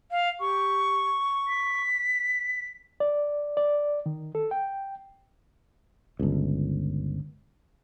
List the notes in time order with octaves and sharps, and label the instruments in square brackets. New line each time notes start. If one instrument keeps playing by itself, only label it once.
[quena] F5
[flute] G4 [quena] C#6
[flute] B6
[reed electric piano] D5
D5
D#3
A4
G5
[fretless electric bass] G1 C#2